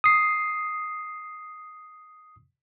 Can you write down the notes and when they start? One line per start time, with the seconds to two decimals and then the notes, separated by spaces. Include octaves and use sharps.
0.04 D#6 C7